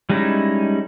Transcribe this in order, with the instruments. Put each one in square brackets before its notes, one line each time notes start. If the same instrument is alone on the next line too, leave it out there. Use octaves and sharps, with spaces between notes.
[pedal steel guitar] G3 G#3 C#4 D#4 E4